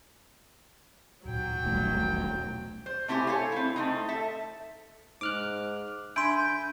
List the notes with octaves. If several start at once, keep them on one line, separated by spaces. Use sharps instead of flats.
D1 A#2 F#3 G5
D#1 B1 E2 G3 A3
C5
A3 C4 E4 F#4 G4 G#5
A4 C#5 F5 G#5
C4 E4
A3 C4 D#4
A4 E5
G#2 D6 F6 F#6
D3 E5 G#5 B5 C6 G6 D7